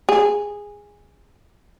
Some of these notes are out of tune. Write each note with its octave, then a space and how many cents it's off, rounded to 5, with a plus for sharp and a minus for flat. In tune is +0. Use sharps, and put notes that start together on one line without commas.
G#4 -15